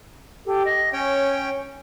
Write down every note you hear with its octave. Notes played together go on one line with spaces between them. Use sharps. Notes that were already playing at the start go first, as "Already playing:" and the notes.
G4 A4
D#5
C#4 C#5 G5 G#5